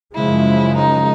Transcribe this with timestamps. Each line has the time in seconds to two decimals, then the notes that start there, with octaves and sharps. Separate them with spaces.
0.15 F#2 C#3 F3 G#3 E4
0.76 D#4